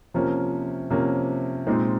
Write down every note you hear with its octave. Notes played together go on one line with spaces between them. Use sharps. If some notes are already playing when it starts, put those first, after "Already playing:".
C3 F3 A#3 C#4
C3 F3 A#3 C#4
A#2 G#3 C4 D#4